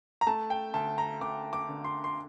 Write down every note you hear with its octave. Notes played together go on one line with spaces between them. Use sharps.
A#5
A3 A5
G5
D2 A5
A#5
D2 D6
D6
D3
C6
C6